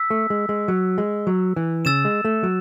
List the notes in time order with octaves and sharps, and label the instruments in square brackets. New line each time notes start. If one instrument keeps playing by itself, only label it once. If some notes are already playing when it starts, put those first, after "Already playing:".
Already playing: [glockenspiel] E6 B6
[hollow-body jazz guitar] A3
G#3
G#3
F#3
G#3
F#3
E3
[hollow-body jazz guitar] C#3 [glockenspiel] E6 A6 E7
[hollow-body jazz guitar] G#3
A3
F#3